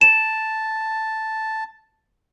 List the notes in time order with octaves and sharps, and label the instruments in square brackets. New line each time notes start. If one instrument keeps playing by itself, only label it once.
[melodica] A5 [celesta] E7